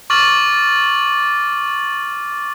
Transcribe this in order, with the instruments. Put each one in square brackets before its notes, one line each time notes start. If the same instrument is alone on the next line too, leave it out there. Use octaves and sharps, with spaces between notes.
[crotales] C#6 D6 F6 A6 F#7